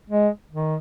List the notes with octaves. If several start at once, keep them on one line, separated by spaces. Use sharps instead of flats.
G#3
D#3